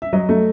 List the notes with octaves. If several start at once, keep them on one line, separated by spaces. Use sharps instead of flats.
E5
F#3 D#5
A3